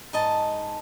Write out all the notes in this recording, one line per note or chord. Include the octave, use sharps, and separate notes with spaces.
G#2 D#5 A5